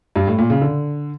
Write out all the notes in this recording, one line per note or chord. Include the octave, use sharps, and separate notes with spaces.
G2
A2
A#2
C#3
D3